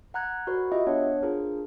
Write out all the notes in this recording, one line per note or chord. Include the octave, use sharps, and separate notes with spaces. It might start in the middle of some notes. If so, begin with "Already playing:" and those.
F#5 A#5 F#6 G#6
F#4 A#4 C5 D5 F#5 B5
F4 G4 D#5 E5
B3 D4 C#5 F#5
D4 F4 G#4 A#4 C5